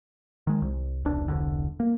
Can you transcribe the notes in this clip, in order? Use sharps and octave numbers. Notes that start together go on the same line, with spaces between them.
D#3 G#3
C2
E1 C2 D4
E1 C2 D3
A#3